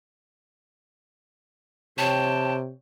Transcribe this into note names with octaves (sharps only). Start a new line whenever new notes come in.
C3 C#5 G5 A5